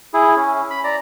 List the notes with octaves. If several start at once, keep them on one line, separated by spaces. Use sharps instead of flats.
E4 G#4
C#4
B5
D5 A#5